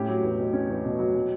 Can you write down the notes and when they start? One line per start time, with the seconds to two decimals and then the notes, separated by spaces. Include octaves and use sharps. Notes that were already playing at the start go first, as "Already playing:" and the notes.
Already playing: A2 C#4 G4
0.08 F#3
0.23 E2
0.38 B2
0.53 C#4
0.69 E2
0.84 B2
0.99 F#3
1.14 B2